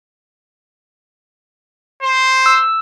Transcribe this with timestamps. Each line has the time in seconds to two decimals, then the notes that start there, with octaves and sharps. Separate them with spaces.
2.03 C5
2.46 E6